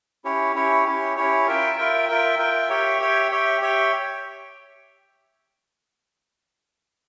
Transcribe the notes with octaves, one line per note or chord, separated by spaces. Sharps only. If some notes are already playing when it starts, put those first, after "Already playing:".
C#4 E4 G4 C#5
C#4 E4 G4 C#5
C#4 E4 G4 C#5
C#4 E4 G4 C#5
F4 A#4 E5 G5
F4 A#4 E5 G5
F4 A#4 E5 G5
F4 A#4 E5 G5
G4 C#5 E5 G5
G4 C#5 E5 G5
G4 C#5 E5 G5
G4 C#5 E5 G5